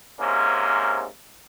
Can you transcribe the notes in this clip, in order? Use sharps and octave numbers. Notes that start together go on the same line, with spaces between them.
G#2 C3 A#3 C#4